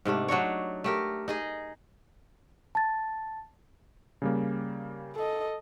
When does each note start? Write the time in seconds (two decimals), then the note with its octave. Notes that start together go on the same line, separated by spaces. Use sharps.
0.05 G#2 C3 A3 D4
0.28 F#3 D4 D#4 C#5
0.84 A3 G4 A#4
1.28 D#4 G#4 D#5
2.75 A5 A6
4.22 C#3 G3 A#3
5.16 A4 D#5